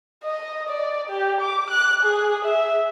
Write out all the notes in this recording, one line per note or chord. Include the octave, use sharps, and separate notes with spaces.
D#5
D5
G4
D6
F#6
G#4
E5